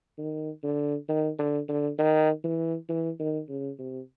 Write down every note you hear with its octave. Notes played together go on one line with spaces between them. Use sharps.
D#3
D3
D#3
D3
D3
D#3
E3
E3
D#3
C#3
C3